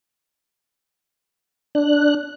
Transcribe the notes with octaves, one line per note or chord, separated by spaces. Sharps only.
D4 F#6